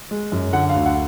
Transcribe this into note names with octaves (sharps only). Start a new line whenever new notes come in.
G#3
F#2
D3 F#5
F5
D2
F#5